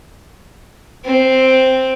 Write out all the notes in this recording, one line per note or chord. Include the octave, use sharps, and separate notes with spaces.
C4